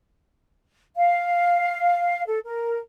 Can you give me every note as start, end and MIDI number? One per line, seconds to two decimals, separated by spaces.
0.96 2.24 77
2.27 2.39 69
2.45 2.78 70